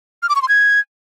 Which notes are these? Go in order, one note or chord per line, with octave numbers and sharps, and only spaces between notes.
F6
D6
C#6
C6
G#6